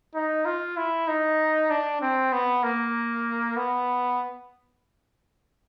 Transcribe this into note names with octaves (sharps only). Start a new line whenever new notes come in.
D#4
F4
E4
D#4
D4
C4
B3
A#3
B3